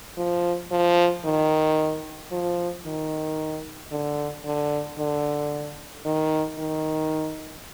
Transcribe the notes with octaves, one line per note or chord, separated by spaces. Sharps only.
F3
F3
D#3
F3
D#3
D3
D3
D3
D#3
D#3